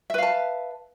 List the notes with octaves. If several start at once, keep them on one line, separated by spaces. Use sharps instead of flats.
B4 E5 F5 A5